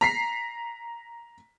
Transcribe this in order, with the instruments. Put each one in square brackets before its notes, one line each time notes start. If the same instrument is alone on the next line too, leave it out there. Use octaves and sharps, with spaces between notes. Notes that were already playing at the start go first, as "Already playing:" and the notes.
[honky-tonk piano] A#5 B6 C7